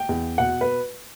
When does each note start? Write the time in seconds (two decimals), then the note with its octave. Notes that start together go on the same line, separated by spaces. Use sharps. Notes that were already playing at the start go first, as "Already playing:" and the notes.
Already playing: G5
0.09 E2
0.38 B2 F#5
0.61 B4